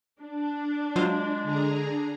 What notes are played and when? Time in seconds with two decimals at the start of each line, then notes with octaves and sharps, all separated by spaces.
0.21 D4
0.96 F#3 G#3 F4 C5
1.43 D3 G#4 A#5